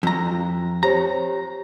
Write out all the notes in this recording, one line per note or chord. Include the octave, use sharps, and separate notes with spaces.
F2 A#5
F4
G4 C5 C#5 A#5